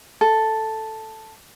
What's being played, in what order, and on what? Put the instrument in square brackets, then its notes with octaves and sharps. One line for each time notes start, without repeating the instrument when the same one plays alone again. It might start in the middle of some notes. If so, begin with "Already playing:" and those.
[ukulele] A4